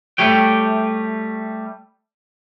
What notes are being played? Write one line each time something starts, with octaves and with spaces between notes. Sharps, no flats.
G3 A3 G4 C#5 G5